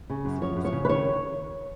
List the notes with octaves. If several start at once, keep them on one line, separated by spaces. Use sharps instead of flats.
C#3
F#2
F3 C#5
F#2
C#5
C#3
B4
D#3 C#5